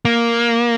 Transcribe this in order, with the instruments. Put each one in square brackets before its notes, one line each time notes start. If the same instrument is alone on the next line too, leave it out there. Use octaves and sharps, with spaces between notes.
[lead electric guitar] A#3